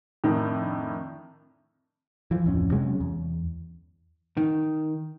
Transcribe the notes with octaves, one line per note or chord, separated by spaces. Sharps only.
F2 A2 D3 D#3
E3 F3
D1 F2 C#4
C3 F#3 G#3 C#4
E2
D#3